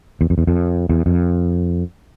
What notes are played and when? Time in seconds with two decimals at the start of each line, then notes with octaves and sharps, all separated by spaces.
0.21 E2
0.30 F2
0.38 E2
0.47 F2
0.89 E2
1.06 F2